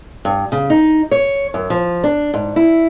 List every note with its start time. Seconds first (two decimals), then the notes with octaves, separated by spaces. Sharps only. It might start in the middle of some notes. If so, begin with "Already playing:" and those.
0.25 G2
0.52 C#3
0.70 D#4
1.11 C#5
1.54 F#2
1.70 F3
2.04 D4
2.34 G#2
2.56 E4